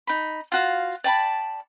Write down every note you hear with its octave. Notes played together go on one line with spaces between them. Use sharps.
D#4 B5
F4 F#4 F5
D5 G5 A5 B5